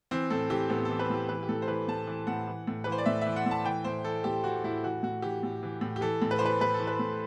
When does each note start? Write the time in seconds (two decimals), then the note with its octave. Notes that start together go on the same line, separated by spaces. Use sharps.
0.11 E3 C4
0.30 A2 A4
0.50 E3 G4
0.69 A2 B3
0.85 E3 A4
0.99 B4
1.10 A2 G4
1.29 E3 B4
1.43 G4
1.49 A2 A4
1.62 C5
1.68 E3 B4
1.88 A2 A5
2.07 E3
2.27 A2 F#5
2.47 E3
2.67 A2
2.84 B4
2.87 E3
2.92 C5
2.98 D5
3.06 A2 E5
3.21 E5
3.27 E3
3.36 F#5
3.46 A2
3.51 A5
3.65 E3 G5
3.84 A2 C5
4.04 E3 A4
4.24 A2 G4
4.43 E3 F#4
4.64 A2 E4
4.83 E3 F#4
5.03 A2 F#4
5.22 E3 G4
5.43 A2
5.63 E3
5.81 A2
5.96 G4
6.01 E3 A4
6.22 A2
6.31 B4
6.39 E3 C5
6.45 B4
6.61 A2 B4
6.74 A4
6.80 E3
6.87 B4
6.99 A2